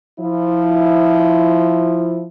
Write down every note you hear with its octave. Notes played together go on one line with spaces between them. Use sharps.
F3 E4